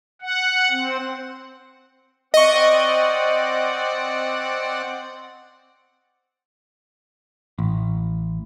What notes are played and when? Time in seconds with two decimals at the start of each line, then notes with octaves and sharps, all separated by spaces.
0.22 F#5
0.70 C4
2.34 C4 D5 D#5 F#5 C#6
7.59 A1